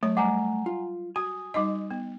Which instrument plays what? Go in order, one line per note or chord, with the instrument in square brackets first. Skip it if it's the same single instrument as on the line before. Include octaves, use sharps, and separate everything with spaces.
[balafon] F#3 C#5 [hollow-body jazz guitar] A3
[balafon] G3 [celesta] F#5 G#5 A#5
[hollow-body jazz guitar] F4
[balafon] F#4 [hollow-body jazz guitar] G#5 [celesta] D#6
[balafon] G3 D#4 D#5
B3